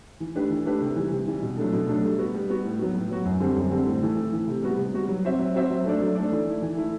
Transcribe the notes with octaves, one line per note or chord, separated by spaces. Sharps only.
E3
A3 D4 G4 B4
E3
A3 D4 G4 B4
C3
E3 G3
C3
E3 G3
B2
F#3 A3 D4 A4
B2
F#3 A3 D4 A4
G3
B3 F#4
G3
B3 F#4
A2
F#3 B3 F#4
A2
F#3 B3 F#4
F#2
D3 G3 C4
F#2
D3 G3 C4
A2
E3 A3
A2
E3 A3
C3
G3 B3 F#4
C3
G3 B3 F#4
F#3
C4 F#4 C5 E5
F#3
C4 F#4 C5 E5
F#3
A3 D4 A4 D5
F#3
A3 D4 A4 D5
E3
A3 E4
E3
A3 E4